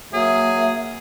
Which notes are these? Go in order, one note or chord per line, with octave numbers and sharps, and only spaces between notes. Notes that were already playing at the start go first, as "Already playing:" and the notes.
F#3 A#3 G#4 E5